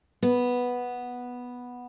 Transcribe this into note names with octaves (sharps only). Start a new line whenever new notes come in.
B3